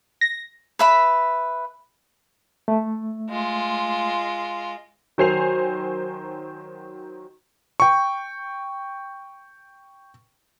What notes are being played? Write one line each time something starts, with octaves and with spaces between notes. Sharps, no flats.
A#6
B4 E5 B5
A3
G#3 F4
D#3 F#3 C5 G#5 C7 F7
G5 C#6